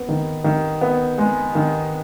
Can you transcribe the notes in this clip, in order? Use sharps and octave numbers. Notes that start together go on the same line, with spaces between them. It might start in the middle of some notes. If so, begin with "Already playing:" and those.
Already playing: B3
D#3
D#3
B3
G#3
D#3